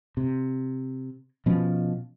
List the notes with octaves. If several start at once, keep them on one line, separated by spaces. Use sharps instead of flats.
C3
B2 F3 C#4